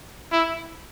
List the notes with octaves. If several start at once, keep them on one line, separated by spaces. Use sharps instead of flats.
E4